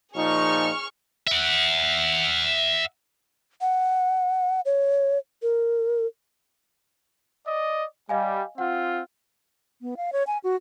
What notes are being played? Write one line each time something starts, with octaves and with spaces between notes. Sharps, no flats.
A#2 F3 D#4 G#4 C#6 F6
E5 F#5
F#5
C#5
A#4
D5 D#5
G3 D#5 F5 G#5
C4 F4 F#5
B3
F5
C#5
G#5
F#4